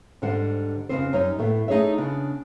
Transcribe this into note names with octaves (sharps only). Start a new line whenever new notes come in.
G#2 D3 G3 C5 F#5
F2 A#2 C#3 B3 C4 C5
F#2 G3 D#4 C#5
A2 A3 B3
A3 D#4 G#4 C#5 E5
C#3 B3 D4